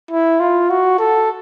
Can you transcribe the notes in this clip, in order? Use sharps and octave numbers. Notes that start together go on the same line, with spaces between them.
E4
F4
F#4
A4